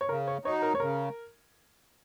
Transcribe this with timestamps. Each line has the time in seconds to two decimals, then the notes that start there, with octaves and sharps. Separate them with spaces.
0.01 C#5
0.09 C#3 A#4
0.27 C#5
0.45 F#3 D#4 C#5
0.62 A#4
0.75 C#5
0.80 C#3 A#4